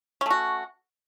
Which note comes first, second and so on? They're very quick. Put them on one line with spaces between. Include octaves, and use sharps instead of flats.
C#4 A3 F#4